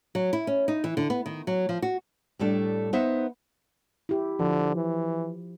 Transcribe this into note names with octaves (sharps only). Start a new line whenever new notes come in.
F#3
E4
C#4
D#4
E3
D3
B3
D#3
F#3
F3
F#4
A2 G3 A3 D4
B3 D#4 C5 E5
E4 G4
D3 F3
E3